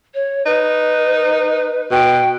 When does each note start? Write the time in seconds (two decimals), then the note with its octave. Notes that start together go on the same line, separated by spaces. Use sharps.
0.14 C#5
0.46 D#4 B4
1.91 B2 G5